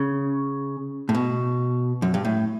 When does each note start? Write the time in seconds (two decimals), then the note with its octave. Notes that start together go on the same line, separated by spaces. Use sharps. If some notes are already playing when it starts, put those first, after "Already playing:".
Already playing: C#3
1.09 A2
1.15 B2
2.02 F#2
2.14 G2
2.25 A2